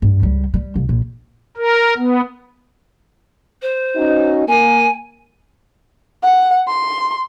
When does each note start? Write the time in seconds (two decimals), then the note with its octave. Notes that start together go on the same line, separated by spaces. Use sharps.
0.02 G2
0.22 C#2 G3
0.54 G3
0.76 C2
0.89 A#1
1.57 A#4
1.97 B3
3.61 C5
3.96 C#4 D#4 F#4
4.48 A#3 G#5
6.23 F#5
6.67 C6